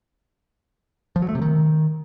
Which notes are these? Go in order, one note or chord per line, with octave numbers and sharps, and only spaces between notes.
F3
F#3
A3
C3
D#3